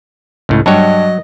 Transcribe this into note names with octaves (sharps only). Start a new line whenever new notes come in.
C#2 A2
G2 F#3 C#5 D#5